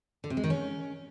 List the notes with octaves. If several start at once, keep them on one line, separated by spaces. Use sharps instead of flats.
D3
C3
G#3
D#3
C#4